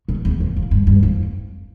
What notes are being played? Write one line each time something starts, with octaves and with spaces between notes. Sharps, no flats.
A#2
E2
F2
F2
G2
G2
F2